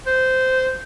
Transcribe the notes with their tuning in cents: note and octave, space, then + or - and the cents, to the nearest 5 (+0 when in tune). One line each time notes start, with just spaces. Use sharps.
C5 -15